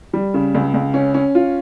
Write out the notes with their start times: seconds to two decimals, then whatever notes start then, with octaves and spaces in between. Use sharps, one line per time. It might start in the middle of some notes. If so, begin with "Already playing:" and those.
0.13 G3
0.34 C#3
0.55 C#2
0.74 C#2
0.94 C#4
1.14 C#4
1.35 F4